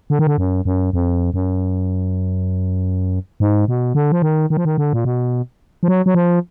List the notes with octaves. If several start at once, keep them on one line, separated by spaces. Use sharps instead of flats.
D3
D#3
D3
F#2
F#2
F2
F#2
G#2
B2
D3
F3
D#3
D#3
F3
D#3
D3
A#2
B2
F3
F#3
F#3
F3